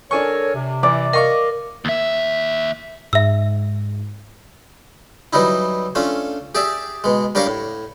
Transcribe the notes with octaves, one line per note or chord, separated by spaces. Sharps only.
D4 A4 A#4 C#5 G#5 C#6
C3
E3 D5
A#4 D#5 F5 C#6 D6
D#2 E5
G#2 E5 E6
E3 F#3 G3 D#4 E4
A3 C#4 D4 F4
G4 G#4 D5 E5
B2 G#3
G3 D4 G4 A#4 C#5 F5
A2